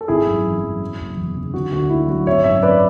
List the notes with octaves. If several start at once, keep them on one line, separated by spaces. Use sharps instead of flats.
A4
G#1 E4 G#4
F#2
E3
F#2
F#3
F#1
E2
C#3
D3 F#4
D2 F#4
A3 E4
F#3 F#4
G#1 C#5 E5
F#2 C#5 E5
G#1 B4 D5